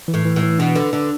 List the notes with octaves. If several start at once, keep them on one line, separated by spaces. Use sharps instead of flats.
E3
A2
E3
A2
E3
B2 D4
D3 B4
D3 D4